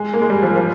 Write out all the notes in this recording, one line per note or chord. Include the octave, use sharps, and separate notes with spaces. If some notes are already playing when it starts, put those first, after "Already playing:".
Already playing: G#3
A#3
G#3
G3
F3
F3